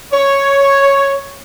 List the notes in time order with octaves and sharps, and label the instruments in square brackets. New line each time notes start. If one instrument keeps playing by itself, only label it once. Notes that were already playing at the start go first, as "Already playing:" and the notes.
[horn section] C#5